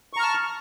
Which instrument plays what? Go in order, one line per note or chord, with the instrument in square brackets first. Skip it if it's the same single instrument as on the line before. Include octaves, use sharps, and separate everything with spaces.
[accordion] C#6
A#5
F6
A5